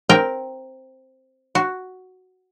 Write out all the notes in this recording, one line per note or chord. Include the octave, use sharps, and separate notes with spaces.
C4 A#4 G5 A#5
F#4